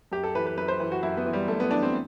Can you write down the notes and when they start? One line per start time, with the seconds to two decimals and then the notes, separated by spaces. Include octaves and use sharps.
0.12 F#2 G4
0.24 A4
0.35 E3 B4
0.47 B4
0.57 F#2 B4
0.68 C5
0.80 E3 B4
0.92 F#4
1.03 F#2 E4
1.17 B3
1.26 E3
1.33 G3
1.48 F#2 A3
1.60 B3
1.71 E3 D4
1.82 C4